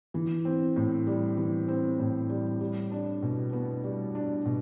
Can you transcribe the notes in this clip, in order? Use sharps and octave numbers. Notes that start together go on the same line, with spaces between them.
E3
C4
A2
G3
E3
C4
A2
G3
G3
D4
B2
B3
G3
D4
B2